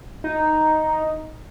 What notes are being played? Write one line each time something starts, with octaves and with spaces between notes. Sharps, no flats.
D#4